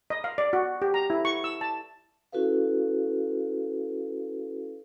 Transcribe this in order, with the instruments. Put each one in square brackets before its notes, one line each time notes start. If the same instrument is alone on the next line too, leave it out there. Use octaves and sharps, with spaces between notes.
[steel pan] D#5
F5
D5
F#4
G4
A#5
E4
C#6
E6
A5
[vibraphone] C#4 E4 F#4 A4 B4 F5